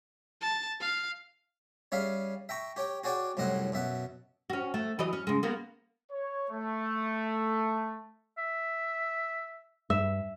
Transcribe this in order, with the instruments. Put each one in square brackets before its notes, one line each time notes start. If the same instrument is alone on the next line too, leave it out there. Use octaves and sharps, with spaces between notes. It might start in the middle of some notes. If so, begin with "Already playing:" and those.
[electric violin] A5
F5
[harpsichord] G3 C#4 G#4 E5 F5
E5 G5 A#5 C#6
G4 C#5 G5
F#4 G#4 C#5 D5 F#5 G5
C2 F#2 A2 C4 D#5 F#5
F#2 B2 E5 F#5
[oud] C#4 F#4
A3
E3 F#3 D#5
C#4
C#3 G#3
A#3 B3
[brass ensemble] C#5
A3
[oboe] E5
[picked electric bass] G2 [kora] E5